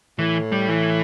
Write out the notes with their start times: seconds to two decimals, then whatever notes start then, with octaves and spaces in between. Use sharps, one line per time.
0.19 A2 E3
0.52 G3
0.68 E3